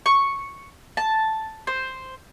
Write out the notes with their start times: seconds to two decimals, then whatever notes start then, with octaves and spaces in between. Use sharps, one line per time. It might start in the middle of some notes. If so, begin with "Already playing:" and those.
0.06 C#6
0.97 A5
1.67 C5